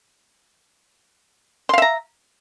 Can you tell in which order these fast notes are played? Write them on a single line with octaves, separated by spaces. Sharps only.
C6 F5 E5 A#5